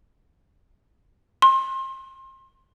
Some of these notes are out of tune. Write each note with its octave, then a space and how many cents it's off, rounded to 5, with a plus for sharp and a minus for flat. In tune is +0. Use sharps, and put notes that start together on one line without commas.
C6 +30